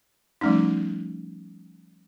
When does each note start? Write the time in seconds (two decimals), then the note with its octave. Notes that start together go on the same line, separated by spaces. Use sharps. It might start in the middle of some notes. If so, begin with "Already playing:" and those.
0.41 F3 G3 A3 C#4 D#4